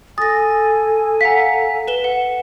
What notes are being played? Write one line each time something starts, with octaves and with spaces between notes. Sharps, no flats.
A4 G#5 D#6 A6 A#6
F5 F#5 A#5 B6
B4 E7 G7
F#5